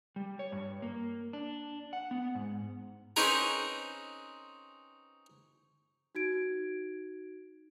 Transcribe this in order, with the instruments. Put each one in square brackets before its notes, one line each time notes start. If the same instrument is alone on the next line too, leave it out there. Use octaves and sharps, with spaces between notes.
[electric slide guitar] G3
C#5
G2
A#3
D4
F#5
B3
G#2
[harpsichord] C4 C#4 D#4 G#4 A#4 B4
[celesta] D#4 F#4 G#6 D7